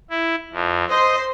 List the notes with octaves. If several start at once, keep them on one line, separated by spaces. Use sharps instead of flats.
E4
F2
C5 D#5 C6